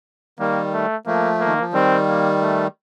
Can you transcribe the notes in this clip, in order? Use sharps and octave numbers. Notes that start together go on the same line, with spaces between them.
D#3 G3 A#3
A3
F3 A3 A#3
A#3
D#3
F3
D#3 G3 C4
A#3
A3